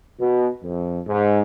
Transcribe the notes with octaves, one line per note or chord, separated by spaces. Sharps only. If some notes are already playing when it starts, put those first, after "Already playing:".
B2
F2
G#2